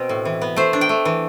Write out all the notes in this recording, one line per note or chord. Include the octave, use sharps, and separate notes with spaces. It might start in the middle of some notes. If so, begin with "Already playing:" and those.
Already playing: B2 C4
A2
E3
B3
A3 C5
D4
G5
A3
E3